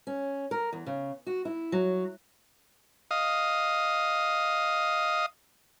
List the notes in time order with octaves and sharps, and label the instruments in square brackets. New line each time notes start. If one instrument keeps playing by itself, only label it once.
[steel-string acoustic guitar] C#4
A#4
E2
C#3
F#4
E4
F#3
[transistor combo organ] D#5 F5 D#6